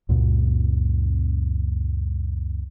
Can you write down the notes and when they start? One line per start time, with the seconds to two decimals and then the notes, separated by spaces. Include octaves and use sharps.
0.09 C#2 F#2 A#2 C#3